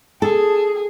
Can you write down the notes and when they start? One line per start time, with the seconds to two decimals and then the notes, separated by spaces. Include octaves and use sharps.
0.22 G#4 A4 A5